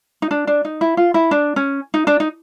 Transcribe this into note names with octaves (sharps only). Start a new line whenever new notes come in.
D#4
D4
D4
D#4
E4
F4
E4
D4
C#4
D#4
D4
D#4